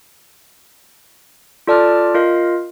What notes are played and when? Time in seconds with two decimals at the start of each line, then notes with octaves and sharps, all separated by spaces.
1.67 F4 A4 D5 A5 D6 F6
2.14 F4 A#4 D#5 F5